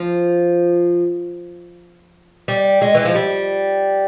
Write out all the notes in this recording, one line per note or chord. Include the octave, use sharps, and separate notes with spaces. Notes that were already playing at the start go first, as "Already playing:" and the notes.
Already playing: F3
G3
G#3
E3
F3
G3